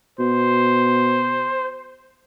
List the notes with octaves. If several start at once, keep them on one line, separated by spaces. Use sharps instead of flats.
B2 C5